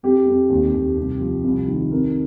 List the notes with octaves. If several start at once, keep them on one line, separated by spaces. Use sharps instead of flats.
F2 G4
F2
D#2
D#2
C2
F3
C2
D#3
F2 A#4